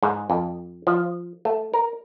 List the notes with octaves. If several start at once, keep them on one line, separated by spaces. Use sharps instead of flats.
G#2
F2
F3
A3
A#4